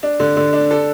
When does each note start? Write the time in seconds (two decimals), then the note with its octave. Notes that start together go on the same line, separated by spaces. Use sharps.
0.03 D4
0.20 D3
0.37 D3
0.53 D4
0.71 A4